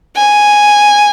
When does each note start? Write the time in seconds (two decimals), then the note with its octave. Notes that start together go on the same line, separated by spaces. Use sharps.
0.16 G#5